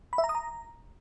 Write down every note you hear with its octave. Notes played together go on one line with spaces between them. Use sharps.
B5
E5
A#5
D#6
A#5